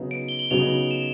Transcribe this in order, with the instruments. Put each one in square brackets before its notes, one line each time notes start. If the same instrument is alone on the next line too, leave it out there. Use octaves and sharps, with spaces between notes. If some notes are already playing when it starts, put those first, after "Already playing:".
Already playing: [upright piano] C#3 F#3 B3 D#4
[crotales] D7
G7
F#7
[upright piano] C#3 F#3 B3 D#4 [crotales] F7
[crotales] E7